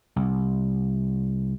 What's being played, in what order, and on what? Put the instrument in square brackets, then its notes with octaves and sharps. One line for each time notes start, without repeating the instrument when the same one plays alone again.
[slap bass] C2